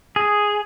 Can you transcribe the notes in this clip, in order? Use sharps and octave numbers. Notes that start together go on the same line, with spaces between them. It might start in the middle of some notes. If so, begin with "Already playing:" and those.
G#4